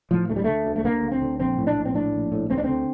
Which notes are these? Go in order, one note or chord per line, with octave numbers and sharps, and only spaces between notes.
A2 F3
D2 A3
G3
D3 A3
D2
A3
D3 A#3
D2
C4
D3
A#1 C4
A2
D4
A#1
C4
A2 D4
A#1
A2
D2 C4
D4
D3 C4